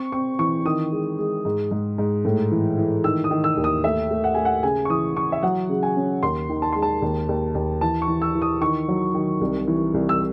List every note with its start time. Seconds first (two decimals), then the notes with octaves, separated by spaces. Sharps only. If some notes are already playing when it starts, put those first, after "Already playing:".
Already playing: C4 C#6
0.12 C4 C#6
0.39 E3 C#6
0.65 D#3 D#6
0.92 G#3
1.19 G#3
1.45 G#2
1.71 G#2
1.98 G#2
2.25 A2
2.51 E3
2.78 E3
3.04 D#3 E6
3.24 D#6
3.31 D#3
3.44 E6
3.57 D#2
3.64 D#6
3.84 A3 E5
4.11 A3
4.24 F#5
4.35 A3 G#5
4.45 F#5
4.63 C#3 G#5
4.85 C#6
4.90 E3 D#6
5.16 E3 C#6
5.32 E5
5.43 F#3 F#5
5.69 C#3
5.83 G#5
5.96 C#4
6.23 D#2 C6
6.50 D#3
6.62 A5
6.72 G#3 C6
6.82 A5
7.02 D#2
7.29 D#2
7.55 D#2
7.81 E3 A5
8.02 C#6
8.08 E3
8.22 E6
8.35 E3
8.42 D#6
8.61 D#3 C#6
8.88 F#3
9.14 D#3
9.41 C2
9.68 E3
9.94 C2
10.09 E6